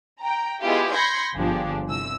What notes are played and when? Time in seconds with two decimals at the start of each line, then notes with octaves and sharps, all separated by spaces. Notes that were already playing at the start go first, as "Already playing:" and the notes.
0.21 G5 A#5
0.62 G#3 B3 E4 F4 G4
0.94 B5 C6 G6 G#6 A#6 C#7
1.35 G1 F3 D4 G4 G#4
1.87 C2 E6